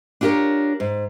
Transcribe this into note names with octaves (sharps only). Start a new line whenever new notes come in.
D4 F4 G4 A4 A#4 C#5
G#2